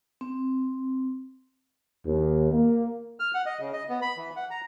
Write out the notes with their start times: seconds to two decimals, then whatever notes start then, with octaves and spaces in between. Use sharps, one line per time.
0.21 C4
2.06 D#2
2.52 A#3
3.20 F6
3.34 F#5
3.46 D#5
3.60 C#3
3.73 D#5
3.89 B3
4.02 B5
4.17 E3
4.36 F#5
4.50 A#5